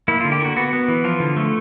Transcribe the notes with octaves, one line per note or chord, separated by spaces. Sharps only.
A#3 E4
D3 F4
G4
A#3 F#4
B3 F#4
B3
E3
F3 F4
D3
A3